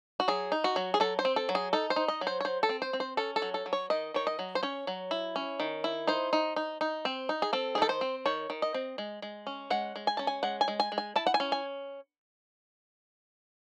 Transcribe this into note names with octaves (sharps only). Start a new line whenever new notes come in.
F#4
F#3 G#4
D#4
F#4
F#3
G#4
F#3 A4
C5
C4
A4
F#3
G#4
D#4 A4
C5
D#4
D#5
F#3
C5
C#5
F#3 C5
A4
C4
C5
C4
C5
C#4 A4
A4
F#3
A4
F#3
C#5
D#3 D#5
D#3 C#5
D#5
F#3
C5
C#4 C#5
F#3
E4
C#4
D#3
E4
D#4 C5
D#4
D#4
D#4
C4
D#4
G#4
C4 A4
G#4
D#3 A4
C5
C4
D#3 C#5
D#3
D#5
C4
G#3
G#3
C#4
G#3 F#5
G#3
G#5
C#4 A5
G#5
G#3 F#5
G#5
G#3
G#5
G#3
G#5
E4 A5
F#5
G#5
C#4
G#5